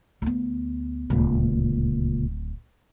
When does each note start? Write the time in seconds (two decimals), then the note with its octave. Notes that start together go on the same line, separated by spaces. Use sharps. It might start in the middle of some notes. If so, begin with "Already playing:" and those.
0.22 D2 B3
1.10 D1 C#2 A#2 D#3